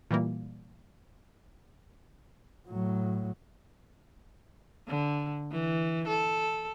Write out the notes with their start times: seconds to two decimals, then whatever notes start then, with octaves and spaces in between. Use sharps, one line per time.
0.11 A#2 E3 G3 A#3
2.69 A2 F#3
4.87 D3
5.51 E3
6.07 A4